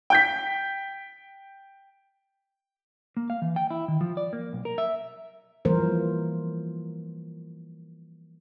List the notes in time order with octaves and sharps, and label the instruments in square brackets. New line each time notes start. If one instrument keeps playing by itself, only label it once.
[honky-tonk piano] G5 G6 B6
[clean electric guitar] A#3
F5
E3
G5
E4
D#3
F3
D5
A#3
B1
A#4
E5
[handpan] E3 F3 G3 A#3 A#4 C5